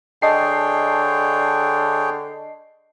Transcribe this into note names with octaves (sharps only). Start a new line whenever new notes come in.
D3 G#4 C#5 D#5 G5 A5 C7